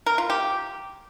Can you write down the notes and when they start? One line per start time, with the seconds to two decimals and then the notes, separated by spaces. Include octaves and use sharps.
0.06 A#4
0.18 F4
0.30 G4